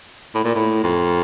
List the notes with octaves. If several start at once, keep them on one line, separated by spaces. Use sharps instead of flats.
A2
A#2
A2
F2